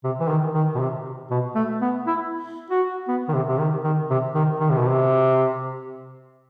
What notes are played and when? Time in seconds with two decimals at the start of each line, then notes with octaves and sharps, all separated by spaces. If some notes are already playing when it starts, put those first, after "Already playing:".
0.04 C3
0.20 E3
0.29 D#3
0.55 D#3
0.75 B2
0.80 C3
1.31 B2
1.56 A3
1.82 B3
2.07 E4
2.71 F#4
3.08 B3
3.29 D#3
3.34 C3
3.48 C3
3.59 D#3
3.84 D#3
4.10 C3
4.35 D#3
4.60 D#3
4.70 C3
4.79 B2
4.88 C3